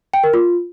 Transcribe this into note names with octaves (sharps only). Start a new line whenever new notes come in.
G5
A#4
F4